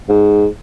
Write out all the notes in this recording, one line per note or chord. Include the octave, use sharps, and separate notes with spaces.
G#2